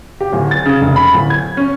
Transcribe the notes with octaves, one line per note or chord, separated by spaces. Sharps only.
G4
D1
A6
C#3
F1
B5
D1
G#6
C#4